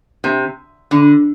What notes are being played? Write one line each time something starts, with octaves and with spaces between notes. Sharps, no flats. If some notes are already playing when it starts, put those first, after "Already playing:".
C3
D3